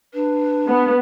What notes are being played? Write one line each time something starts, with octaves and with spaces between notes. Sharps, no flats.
D4 B4
B3